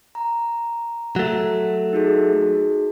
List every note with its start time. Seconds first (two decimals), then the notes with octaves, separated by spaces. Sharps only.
0.15 A#5
1.16 F#3 A3
1.93 D#4 F#4 G#4